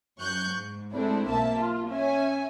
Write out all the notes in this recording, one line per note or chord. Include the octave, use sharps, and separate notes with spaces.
F#2 C#6 F#6 G6
G#2
G#3 A3 C4 D4 E4
B1 A#3 E5 A5
F4
C#4 E5 G#5